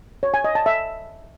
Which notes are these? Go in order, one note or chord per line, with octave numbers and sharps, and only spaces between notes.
C#5
G#5
D#5
A5
E5